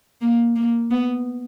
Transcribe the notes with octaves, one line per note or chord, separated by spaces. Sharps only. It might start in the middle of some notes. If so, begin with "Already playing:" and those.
A#3
A#3
B3